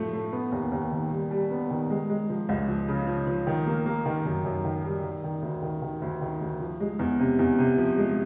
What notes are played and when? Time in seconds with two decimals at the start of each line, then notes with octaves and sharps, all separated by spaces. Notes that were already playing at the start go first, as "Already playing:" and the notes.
Already playing: A2 F3 A3
0.13 A3
0.32 B3
0.52 D#2
0.72 D#2
0.91 D#3
1.11 G3
1.31 G3
1.51 B3
1.70 D#3
1.90 G#3
2.09 G#3
2.30 F3
2.49 C#2
2.68 F3
2.88 C#3
3.07 F3
3.27 F3
3.47 D#3
3.67 A#3
3.86 A#3
4.06 D#3
4.25 F#2
4.45 F#2
4.65 D#3
4.84 G3
5.03 D#3
5.24 D#3
5.42 D2
5.62 D#3
5.82 D#3
6.02 D2
6.21 D#3
6.41 D2
6.60 F3
6.80 G#3
6.99 E2
7.19 C3
7.39 E2
7.59 C3
7.78 F3
7.98 G#3